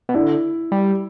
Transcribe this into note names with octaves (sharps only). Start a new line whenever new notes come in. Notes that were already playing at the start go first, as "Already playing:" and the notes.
B2
D3 E4
G3